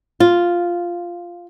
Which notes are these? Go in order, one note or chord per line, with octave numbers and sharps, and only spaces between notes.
F4